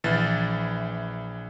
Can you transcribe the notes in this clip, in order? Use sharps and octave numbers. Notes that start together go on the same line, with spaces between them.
A#1 E3 A6